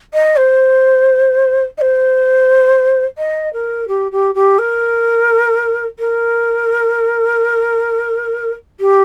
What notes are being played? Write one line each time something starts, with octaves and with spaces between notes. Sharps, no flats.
D#5
C5
D#5
C5
D#5
A#4
G4
G4
G4
A#4
A#4
G4